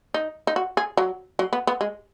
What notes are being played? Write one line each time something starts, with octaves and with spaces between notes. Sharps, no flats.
D#4
D#4
F#4
G#4
F#3
F#3
B3
B3
G#3